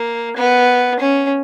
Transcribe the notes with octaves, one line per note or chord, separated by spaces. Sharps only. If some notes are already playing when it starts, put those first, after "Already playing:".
Already playing: A#3
B3
C#4